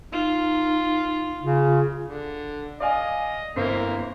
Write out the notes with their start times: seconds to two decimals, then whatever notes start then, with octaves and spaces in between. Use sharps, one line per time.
0.12 D#4 F4
1.42 C#3 F4
2.05 D3
2.80 D5 D#5 F5 G#5
3.56 G1 E3 A#3 C4 C7